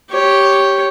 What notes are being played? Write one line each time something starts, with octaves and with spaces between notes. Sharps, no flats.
G4 C#5